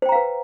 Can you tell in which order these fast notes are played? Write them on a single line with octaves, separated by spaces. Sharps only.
C5 G5 A#5 F5 B4